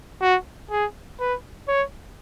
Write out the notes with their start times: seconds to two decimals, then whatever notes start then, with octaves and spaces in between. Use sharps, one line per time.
0.21 F#4
0.71 G#4
1.19 B4
1.68 C#5